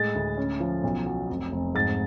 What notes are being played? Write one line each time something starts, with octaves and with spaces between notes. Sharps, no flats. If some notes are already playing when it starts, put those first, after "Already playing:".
Already playing: A2 G#3 A6
D2
C#4
F3
B1
F#3
F1
F1
G#2 A6